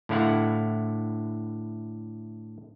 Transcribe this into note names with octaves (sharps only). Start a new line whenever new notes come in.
A2 D3 E4 F5 F#5